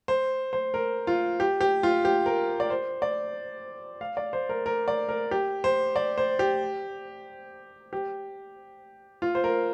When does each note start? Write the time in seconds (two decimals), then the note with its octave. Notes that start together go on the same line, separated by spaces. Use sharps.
0.08 C5
0.53 C5
0.74 A#4
1.07 F4
1.40 G4
1.61 G4
1.83 F4
2.05 G4
2.26 A#4
2.60 D5
2.70 C5
3.02 D5
4.01 F5
4.17 D5
4.33 C5
4.49 A#4
4.66 A#4
4.88 D5
5.09 A#4
5.31 G4
5.64 C5
5.96 D5
6.18 C5
6.39 G4
7.93 G4
9.22 F4
9.35 C5
9.44 A#4